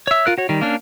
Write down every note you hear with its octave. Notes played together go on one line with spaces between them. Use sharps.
C#5 E5
F4 A#4 F#6
F#4 C#5
D#3 G3
A#3 C#4 D4